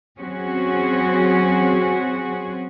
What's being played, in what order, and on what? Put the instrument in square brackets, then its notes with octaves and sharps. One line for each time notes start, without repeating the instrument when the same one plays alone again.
[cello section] F#3 C4 C#4 F#4 G#4